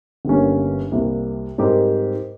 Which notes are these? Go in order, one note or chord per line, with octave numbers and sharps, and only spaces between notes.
G1 G2 G3 A#3 C#4
C2 C3 G3 A#3
G#2 G3 C4 G4 A#4